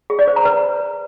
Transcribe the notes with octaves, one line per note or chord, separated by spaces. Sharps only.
G#4
D5
C5
A#5
B4